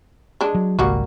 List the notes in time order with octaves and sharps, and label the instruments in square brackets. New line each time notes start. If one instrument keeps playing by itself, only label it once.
[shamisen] G#3 D4
[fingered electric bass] F#3
[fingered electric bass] G#1 C#2 [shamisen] G3 A#3 F#4